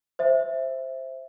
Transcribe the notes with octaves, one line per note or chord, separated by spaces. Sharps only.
C5 E5